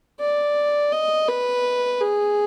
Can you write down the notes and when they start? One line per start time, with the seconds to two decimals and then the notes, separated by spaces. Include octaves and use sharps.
0.20 D5
0.92 D#5
1.28 B4
2.01 G#4